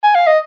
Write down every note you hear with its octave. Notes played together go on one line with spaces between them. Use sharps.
G#5
F5
D#5